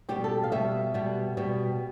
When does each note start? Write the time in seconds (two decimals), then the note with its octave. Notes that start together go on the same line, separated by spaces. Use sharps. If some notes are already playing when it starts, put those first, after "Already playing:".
0.09 B2 G3 B3 G4
0.24 A4
0.44 F5
0.52 B2 G3 B3 E5
0.94 B2 G3 B3
1.37 B2 G3 B3